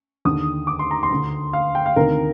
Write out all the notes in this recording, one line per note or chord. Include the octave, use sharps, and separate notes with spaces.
D#2 D3 D#6
D6
C6
A#5
C6
D2 D3
F5
G5
F5
D2 C3 D#3 A#4